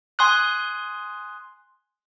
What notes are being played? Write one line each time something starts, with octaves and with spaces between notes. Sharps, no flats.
G#5 C6 D#6 F#6